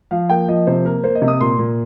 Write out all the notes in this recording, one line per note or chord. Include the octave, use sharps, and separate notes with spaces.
F3 F5
A#3 G5
F3 D#5
C3 C5
A#3 A#4
A#3 C5
D#5
C3
D#6
A#2 C6
A#2